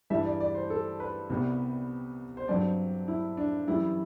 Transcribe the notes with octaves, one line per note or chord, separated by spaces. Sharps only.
G2 E3 G3 E5
D5
D5
C5
A4
B4
C2 C3 G3 B3
C5
G2 F#3 C4 D5
E4
D4
F#2 E3 G3 E4